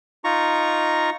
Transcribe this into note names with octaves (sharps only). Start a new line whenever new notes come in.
D#4 F4 A#5 C#6